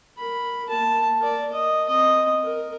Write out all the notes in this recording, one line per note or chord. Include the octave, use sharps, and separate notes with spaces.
A#4 B5
A#3 A5
A#4 D5
D#5
C4 D#5
A#4